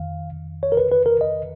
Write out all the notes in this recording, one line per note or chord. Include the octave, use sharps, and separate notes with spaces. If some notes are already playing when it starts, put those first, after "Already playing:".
Already playing: F2 D#3 F5
C#5
A#4
B4
B4
A#4
D#5